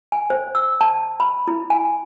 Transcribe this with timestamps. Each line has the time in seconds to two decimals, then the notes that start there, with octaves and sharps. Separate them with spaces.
0.12 G#5
0.30 C5
0.55 E6
0.81 A5
1.20 B5
1.48 E4
1.70 G#5